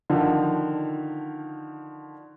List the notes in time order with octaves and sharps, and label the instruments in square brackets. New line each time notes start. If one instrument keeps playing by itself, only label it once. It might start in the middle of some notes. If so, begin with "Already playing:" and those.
[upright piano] D3 D#3 F3